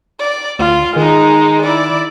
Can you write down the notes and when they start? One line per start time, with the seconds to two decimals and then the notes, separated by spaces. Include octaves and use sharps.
0.19 D5
0.59 D2 F4
0.96 D#3 G#3 D#4
1.62 E4 D5